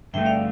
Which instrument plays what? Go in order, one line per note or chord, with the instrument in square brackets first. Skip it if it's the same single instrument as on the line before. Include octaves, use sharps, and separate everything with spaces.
[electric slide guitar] G2 D3 A3 [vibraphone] E5 G5
[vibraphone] D5 F5